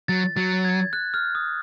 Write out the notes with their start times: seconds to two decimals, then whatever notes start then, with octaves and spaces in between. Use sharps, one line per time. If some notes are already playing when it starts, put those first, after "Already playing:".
0.08 F#3 A6
0.37 F#3 A6
0.65 G#6
0.93 F#6
1.14 F6
1.35 D#6